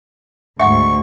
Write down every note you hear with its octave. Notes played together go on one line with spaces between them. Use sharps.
D2 G#2 E5 F#5 C#6